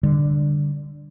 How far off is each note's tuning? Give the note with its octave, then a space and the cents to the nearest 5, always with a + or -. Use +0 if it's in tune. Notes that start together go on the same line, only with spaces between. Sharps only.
D3 +0 G3 +10